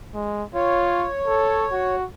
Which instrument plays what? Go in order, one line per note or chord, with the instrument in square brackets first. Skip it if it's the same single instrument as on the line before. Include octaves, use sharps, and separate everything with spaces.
[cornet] G#3
[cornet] F4 [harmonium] C#5
[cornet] A4
F#4